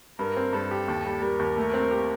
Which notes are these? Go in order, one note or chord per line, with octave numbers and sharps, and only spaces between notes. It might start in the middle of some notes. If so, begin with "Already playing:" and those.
G2 A#4
C4
G2 A4
G4
D#2
G3
G3 A#4
D#2
A3
C4
G4